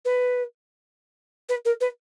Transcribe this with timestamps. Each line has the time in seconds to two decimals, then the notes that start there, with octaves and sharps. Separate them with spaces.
0.05 B4
1.49 B4
1.65 A#4
1.81 B4